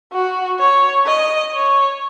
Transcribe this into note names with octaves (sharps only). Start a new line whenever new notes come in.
F#4
C#5
D#5
C#5